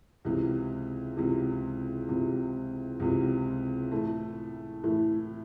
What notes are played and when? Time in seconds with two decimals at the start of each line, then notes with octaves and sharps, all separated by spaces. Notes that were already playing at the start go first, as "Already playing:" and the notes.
0.25 C#2 C3 E3
1.17 C#2 C3 E3
2.08 C#2 C3 E3
3.00 C#2 C3 E3
3.92 A2 E3 A3
4.84 A2 E3 A3